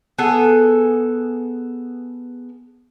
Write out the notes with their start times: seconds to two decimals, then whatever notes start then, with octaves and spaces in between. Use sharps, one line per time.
0.18 B3 G#4 A4